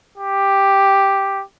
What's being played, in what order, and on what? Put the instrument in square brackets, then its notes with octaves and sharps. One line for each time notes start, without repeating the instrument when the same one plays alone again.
[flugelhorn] G4